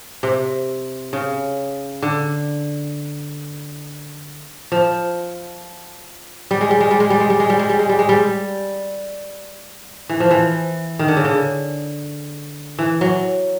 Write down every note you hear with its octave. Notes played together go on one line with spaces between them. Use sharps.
C3
C#3
D3
F3
G3
G#3
G3
G#3
G3
G#3
G3
G#3
G3
G#3
G3
G#3
G3
G#3
G3
G#3
G3
E3
F3
E3
D#3
D3
C#3
D3
E3
F#3